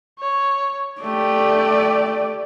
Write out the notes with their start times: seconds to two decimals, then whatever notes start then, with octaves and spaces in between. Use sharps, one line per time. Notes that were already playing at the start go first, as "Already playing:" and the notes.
0.19 C#5
1.02 A3 G4 D5